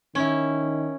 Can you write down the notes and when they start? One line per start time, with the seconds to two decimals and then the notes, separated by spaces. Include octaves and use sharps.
0.15 D#3 C#4 E4